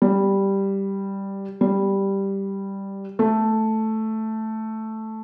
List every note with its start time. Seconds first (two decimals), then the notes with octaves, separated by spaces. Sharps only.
0.02 G3
1.61 G3
3.19 A3